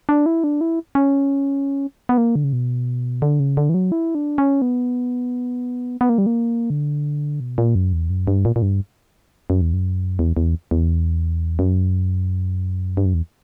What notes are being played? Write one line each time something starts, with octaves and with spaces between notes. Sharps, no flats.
D4
E4
D4
E4
C#4
B3
A#3
D3
C#3
B2
D3
C#3
D3
E3
F#3
E4
D4
C#4
B3
B3
A#3
G3
A#3
D3
B2
A#2
F#2
E2
F#2
G2
A#2
A#2
G2
F#2
E2
F#2
E2
E2
E2
F#2
G2
F#2
E2